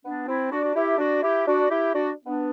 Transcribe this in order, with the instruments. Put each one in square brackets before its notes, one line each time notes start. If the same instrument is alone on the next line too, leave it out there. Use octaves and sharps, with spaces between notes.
[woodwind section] B3 D4
C4 E4
D4 F#4
F#4
E4 G4
D4 F#4
E4 G4
D4 F#4
E4 G4
D4 F#4
B3 D4